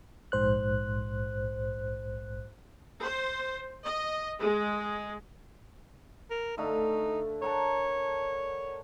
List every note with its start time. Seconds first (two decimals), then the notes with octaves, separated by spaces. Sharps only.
0.32 A#1 G#2 C5 F#6
3.03 C5
3.85 D#5
4.41 G#3
6.30 A#4
6.58 D3 A3 D#4 F5
7.42 A#4 C#5 F#5 A5